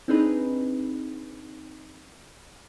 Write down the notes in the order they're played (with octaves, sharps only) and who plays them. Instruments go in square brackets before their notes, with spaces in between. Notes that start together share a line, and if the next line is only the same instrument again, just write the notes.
[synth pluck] C4 D4 D#4 G#4 B4